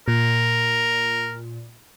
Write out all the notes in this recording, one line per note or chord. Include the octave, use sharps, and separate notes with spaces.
A#2 A#4